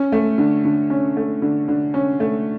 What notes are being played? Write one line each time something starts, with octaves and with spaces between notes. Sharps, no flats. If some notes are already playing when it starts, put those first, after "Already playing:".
Already playing: C#4
A3
D3
D3
C#4
A3
D3
D3
C#4
A3